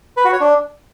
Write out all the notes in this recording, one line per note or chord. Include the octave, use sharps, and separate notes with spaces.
B4
F#4
C#5
D4